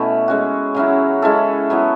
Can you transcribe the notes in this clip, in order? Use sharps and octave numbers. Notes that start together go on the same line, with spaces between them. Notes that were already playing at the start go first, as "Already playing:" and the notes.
Already playing: B2 A3 C#4 E4
G#3 C#4 F#4
C#3 F#3 C#4 E4
G#3 C#4 E4 A4
F#3 B3 E4